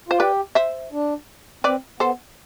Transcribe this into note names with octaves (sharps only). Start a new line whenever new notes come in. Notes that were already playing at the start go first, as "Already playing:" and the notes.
F4 C5
G4 B4 D5
C5 E5
D4
C4 B4 D5
B3 A4 C5